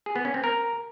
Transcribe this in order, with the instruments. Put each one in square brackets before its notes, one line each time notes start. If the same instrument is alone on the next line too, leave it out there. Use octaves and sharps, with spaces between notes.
[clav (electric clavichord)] G#4
B3
C#4
C4
A#4